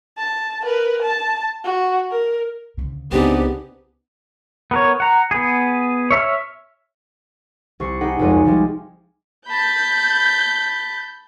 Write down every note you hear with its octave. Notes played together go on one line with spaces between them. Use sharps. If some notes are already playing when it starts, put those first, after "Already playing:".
A5
A#4 B4
A5
F#4
A#4
D2 C#3
C#2 B3 C4 D4 D#4 G4 G#4
B3 A#4 C#5
F#5 A#5
B3 G#4
C#5 E5 A#5 F6
C2 C#6 C7
D#4 G4 G#4 F#5
F1 C2 F2 G#3 D#7
F#4
F3 G3 G#3
A5 B5 G6